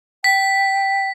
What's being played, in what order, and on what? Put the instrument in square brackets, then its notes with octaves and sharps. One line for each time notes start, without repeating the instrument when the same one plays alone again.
[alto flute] G5 [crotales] B6